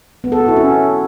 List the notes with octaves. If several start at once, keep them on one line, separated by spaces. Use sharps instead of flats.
B3
A4
F#4
E4
C#4